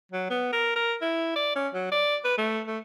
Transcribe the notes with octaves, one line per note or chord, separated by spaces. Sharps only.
F#3
B3
A#4
A#4
E4
D5
C#4
F#3
D5
B4
A3
A3